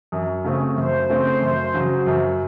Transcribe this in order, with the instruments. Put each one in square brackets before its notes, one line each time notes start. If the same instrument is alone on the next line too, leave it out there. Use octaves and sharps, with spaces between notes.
[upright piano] F#2
C#3 A3 C4
[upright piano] F#2 [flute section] C5
[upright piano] C#3 A3 C4
F#2
C#3 F#3
F#2